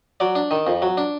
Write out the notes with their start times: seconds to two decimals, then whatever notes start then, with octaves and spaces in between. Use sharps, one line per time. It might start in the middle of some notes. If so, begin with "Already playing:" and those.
0.20 F#3 D5
0.35 D4
0.51 D#3
0.67 F2
0.82 F#3
0.97 D4